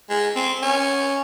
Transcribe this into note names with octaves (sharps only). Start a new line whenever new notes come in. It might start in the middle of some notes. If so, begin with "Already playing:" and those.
G#3
C4
C#4